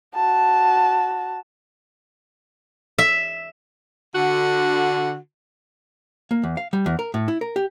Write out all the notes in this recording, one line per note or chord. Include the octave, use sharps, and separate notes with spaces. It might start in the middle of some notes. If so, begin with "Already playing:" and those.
F#4 A5
E5
D3 F#4
A#3
E2
F5
G3
E2
A#4
A2
E4
A#4
G4